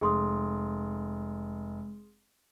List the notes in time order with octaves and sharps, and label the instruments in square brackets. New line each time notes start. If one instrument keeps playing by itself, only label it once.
[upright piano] F1 [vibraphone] G#3 [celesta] G#4 C6 D#6